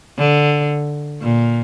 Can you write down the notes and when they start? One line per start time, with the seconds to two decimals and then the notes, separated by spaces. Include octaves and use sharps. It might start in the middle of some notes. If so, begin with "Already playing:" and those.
0.18 D3
1.22 A#2